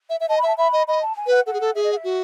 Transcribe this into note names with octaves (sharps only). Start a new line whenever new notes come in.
E5
E5
D#5 A5
B5
E5 A5
E5 B5
D#5
D#5 B5
A5
G#5
B4 F#5
A4 F#5
G#4
A4
G#4 E5
D#5
F#5
E5
F#4